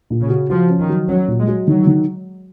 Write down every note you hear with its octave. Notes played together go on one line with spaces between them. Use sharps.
A#2
C#3
F#4
F3 F#4
C#4
D#3
F#3
F#3 C#4
A#2
G#3
F#3
D#3 F#3
D#3